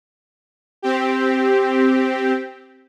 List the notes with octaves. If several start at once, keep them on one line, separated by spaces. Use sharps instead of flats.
C4 G4